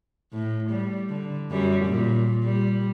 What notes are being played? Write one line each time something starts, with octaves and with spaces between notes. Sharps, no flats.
A2
G3
D3
F#2 G3
A#2
G3